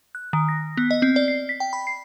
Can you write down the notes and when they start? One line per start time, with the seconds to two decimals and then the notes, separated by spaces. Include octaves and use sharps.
0.15 F#6
0.33 D#3
0.49 A#6
0.77 B3
0.91 D#5
1.02 C4
1.16 D5
1.28 C7
1.49 B6
1.60 G5
1.73 B5
1.87 C7